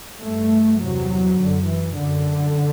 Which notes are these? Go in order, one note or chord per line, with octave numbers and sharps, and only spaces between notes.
G2 A3
E2 C3 F#3
F#2 D3
E3
F#2 D3